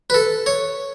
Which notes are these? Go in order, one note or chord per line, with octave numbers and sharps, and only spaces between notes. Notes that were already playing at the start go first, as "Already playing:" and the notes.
B4
A4
C#5